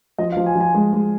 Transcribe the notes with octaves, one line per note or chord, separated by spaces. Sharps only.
F3 D#5
F5
F3
G#5
F3
G#5
G#3 G#5
G#3